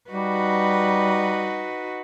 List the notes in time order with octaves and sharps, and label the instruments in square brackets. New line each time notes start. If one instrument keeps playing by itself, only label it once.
[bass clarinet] G3 [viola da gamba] D#4 F#4 B4